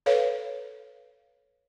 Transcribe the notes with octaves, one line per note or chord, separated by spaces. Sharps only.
A4 B4 C#5 F5